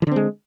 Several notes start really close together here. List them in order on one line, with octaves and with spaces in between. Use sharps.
E3 D3 C4 G#3